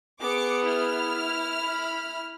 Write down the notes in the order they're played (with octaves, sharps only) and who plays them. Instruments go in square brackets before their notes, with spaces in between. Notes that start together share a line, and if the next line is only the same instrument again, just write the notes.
[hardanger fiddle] B3 G#4 [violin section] D6 C#7
[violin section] E4 F6
[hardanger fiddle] B5